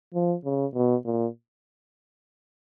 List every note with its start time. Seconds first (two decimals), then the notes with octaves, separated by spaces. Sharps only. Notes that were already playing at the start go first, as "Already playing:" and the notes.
0.14 F3
0.45 C#3
0.74 B2
1.05 A#2